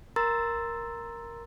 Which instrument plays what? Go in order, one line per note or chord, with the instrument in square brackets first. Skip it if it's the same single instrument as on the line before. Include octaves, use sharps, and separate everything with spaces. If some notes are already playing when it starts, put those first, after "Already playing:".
[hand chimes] A#4 A#5 C6 E6 A6